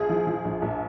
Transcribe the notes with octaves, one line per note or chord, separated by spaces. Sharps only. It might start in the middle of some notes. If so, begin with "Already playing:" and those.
Already playing: A#1 G#4
F3
F3
A#1
A#1